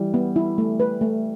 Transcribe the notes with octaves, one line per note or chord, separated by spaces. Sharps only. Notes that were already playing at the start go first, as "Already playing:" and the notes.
Already playing: E3 G3
B3
E4
A3
B4
A3